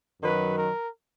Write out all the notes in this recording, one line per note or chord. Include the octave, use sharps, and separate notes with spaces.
F#2 D#3 F#3 B4
A#4